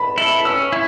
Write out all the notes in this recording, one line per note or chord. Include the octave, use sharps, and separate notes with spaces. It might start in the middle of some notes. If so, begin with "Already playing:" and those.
Already playing: A5 B5
E4 A4
C#4 E6
E4